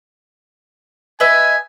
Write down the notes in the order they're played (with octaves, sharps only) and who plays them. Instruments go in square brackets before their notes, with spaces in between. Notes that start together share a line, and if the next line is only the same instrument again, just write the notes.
[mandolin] B4 D#5 E5 [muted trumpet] G#5